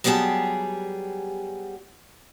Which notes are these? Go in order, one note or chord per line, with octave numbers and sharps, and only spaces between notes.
F#3 G3 B3 G4 G#4 A5